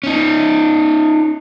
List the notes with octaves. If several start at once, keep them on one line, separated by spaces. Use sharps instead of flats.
C#4 D#4